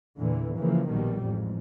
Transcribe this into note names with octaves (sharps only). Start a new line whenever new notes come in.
E2 A#2 D3 E3
C#3 E3 F3 A#3
A#1 B2 D#3 G3
A1 F2 G#2